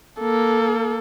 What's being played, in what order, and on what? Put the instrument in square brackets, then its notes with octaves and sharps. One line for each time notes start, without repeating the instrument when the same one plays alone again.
[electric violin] A#3 A4